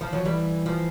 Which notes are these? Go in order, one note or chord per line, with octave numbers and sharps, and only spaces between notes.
F3
F3 F#3
E3 G3
F3